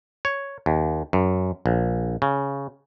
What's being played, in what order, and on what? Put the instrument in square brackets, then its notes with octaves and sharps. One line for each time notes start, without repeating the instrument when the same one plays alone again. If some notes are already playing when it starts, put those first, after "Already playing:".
[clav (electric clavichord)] C#5
D#2
F#2
A#1
C#3